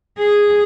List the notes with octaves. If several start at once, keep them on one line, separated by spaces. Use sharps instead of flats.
G#4